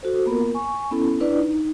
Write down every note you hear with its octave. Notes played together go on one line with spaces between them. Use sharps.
F#4 A4 C5
A#3 B3 F4 A#4
G#5 C#6
B3 C#4 E4 A4
D4 E4 B4 D5
D#4